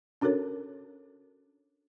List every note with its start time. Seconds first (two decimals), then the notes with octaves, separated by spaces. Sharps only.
0.21 C#4 D4 F#4 A4 A#4 C#5